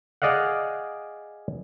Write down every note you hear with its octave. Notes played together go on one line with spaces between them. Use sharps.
G#4 D5 D#5 F5 F#5